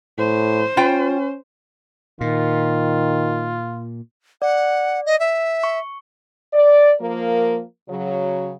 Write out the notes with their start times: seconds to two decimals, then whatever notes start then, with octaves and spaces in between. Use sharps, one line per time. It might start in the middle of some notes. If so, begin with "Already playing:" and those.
0.18 A2 C5
0.77 C#4 F4 G5
2.21 A#2 D#3 F4
4.42 D5 F#5
5.06 D#5
5.20 E5
5.64 C#6
6.54 D5
7.01 F3 A#3 A#4
7.89 C#3 F#3